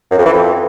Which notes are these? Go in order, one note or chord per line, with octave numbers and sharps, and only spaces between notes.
F#2
F2
E3
F2